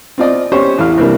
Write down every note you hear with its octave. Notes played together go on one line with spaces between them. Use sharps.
C4 F4 D5 D#5
C#4 G4 C5 C#5
A1 E2 E4 F5 F6
C3 E3 G3 A#3 D4